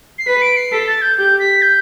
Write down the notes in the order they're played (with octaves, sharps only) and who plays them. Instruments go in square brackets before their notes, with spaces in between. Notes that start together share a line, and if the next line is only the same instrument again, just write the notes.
[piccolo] C7
[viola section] B4 [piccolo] B6
[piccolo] D7
C7
[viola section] A4 [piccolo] B6
[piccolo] A6
G6
[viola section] G4 [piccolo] G6
[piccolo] B6
G6